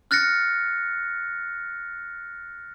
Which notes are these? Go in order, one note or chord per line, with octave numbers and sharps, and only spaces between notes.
F6 F#6 A6 A#6 C#7